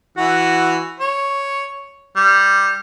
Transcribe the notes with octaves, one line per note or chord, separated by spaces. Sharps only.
E3 F#4
C#5
G3